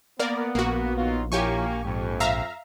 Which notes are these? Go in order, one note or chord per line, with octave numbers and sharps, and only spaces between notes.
A#3 B3 A#4 D5
A#1 A#3 F#4
F#3 B3 D#4 F4
F3 A#3 E4 G4 C#5 G#5 C#6
F2 G#2
E5 F5 A#5